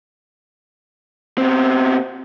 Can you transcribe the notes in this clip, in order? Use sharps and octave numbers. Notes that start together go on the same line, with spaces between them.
B2 C4